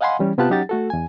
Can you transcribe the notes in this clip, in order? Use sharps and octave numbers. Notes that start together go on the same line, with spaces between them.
D#5 F5 F#5 G#5 B5 C6
E3 G3 C#4
C3 B3 F4 G4 A5 F#6
F#3 C#4 D#4 G4 F#5 A6
A3 F#4 A4
E2 G#5